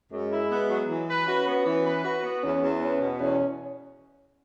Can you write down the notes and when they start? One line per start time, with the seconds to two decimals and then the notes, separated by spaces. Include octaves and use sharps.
0.11 F#2 G#3
0.31 E4
0.51 B3
0.69 F#3
0.89 E3
1.09 B4
1.27 C#4 F#4
1.47 B3
1.66 E3
1.85 B4
2.04 F#4
2.23 B3
2.43 E2 C#4
2.62 E2
2.81 B3 C#4
3.00 B2
3.20 E2 C#4